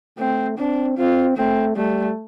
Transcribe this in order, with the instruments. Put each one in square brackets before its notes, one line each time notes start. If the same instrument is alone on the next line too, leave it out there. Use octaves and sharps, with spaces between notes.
[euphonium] A3 [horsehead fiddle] C4
[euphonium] C4 [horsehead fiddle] D4
[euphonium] C4 [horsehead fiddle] F4
[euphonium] A3 [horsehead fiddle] C4
[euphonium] G3 [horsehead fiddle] A3